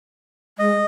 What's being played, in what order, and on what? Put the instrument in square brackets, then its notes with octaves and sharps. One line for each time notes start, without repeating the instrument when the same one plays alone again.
[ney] G#3 [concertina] D#5